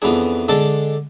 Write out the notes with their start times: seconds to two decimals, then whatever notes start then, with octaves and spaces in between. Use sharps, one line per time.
0.02 F2 E3 B3 D4 G#4
0.48 D3 G#3 D4 A4 D5